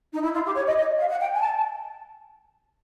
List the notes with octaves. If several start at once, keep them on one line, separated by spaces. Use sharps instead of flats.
D#4
E4
F4
G4
C#5
D#5
D#5
F5
F#5
G5
G#5
A5